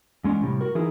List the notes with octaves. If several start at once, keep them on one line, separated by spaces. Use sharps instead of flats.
E2 G#3 C#4 D4
A2 C3 G3
F#4 A#4
E3 D#4 E4 G#4 A#4